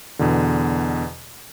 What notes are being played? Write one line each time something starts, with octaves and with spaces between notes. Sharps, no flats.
E2 B2 D3